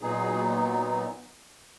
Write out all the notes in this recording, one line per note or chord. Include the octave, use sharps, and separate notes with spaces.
A#2 F#3 B3 D#4 G#4